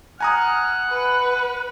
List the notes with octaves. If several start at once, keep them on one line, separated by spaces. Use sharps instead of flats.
F#5 G#5 A#5 D#6 F6
B4